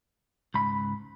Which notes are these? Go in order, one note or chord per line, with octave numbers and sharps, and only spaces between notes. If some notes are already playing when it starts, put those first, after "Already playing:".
C#2 G#2 B5